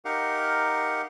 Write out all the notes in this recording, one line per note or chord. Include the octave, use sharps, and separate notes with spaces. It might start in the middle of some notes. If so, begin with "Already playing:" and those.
D#4 G4 A#4 F5 F#5